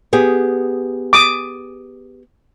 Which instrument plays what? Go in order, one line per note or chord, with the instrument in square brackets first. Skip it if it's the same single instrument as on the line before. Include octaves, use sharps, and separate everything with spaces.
[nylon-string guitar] B3 G4 G#4
[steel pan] D6 D#6